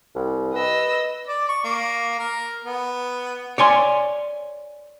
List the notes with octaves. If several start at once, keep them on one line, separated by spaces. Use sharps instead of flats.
C2
B4 D#5 E6
D5
C#6
A#3
A#4
B3
C#5 D5 G#5 C6